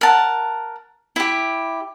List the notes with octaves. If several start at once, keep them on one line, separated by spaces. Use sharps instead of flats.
A#4 F#5 A5
E4 G4